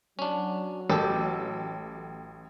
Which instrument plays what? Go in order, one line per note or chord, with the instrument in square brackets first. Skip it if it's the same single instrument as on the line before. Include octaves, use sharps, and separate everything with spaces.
[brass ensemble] F#3 [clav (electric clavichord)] C#4 D4
[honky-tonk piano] A1 [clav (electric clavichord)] G4 A4